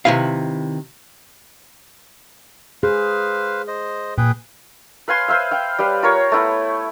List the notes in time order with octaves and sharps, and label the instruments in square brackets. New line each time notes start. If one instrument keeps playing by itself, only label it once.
[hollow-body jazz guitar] C3 D#3 E4 B4 F5
[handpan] G#4 [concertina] B4 C5 F5
[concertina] C5 D#5
[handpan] A#2 [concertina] G#4 B4 G5
[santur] B4 F5 G#5 C6
B4 C5 E5 F5
F5 G5
G3 B4 F5
F4 A#4 C#5
A3 B3 E4